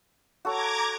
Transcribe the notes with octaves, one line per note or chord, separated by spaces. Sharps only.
F#4 A4 C#5 A#5 D6 G#6